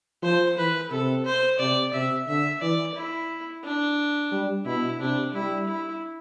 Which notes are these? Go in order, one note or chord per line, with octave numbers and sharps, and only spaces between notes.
F3 C5
E3 B4
C3 A4
C5
C3 D5
C3 E5
D3 E5
E3 D5
E4
D4
G3
B2 E4
C3 D4
G3 E4
E4